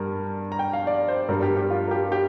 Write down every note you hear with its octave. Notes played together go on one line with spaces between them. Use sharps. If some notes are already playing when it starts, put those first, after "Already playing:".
Already playing: G2 G3 A#4
A#5
G5
F5
D5
C5
G2 G3 A#4
G4
G4
F4
A#4
G4
G4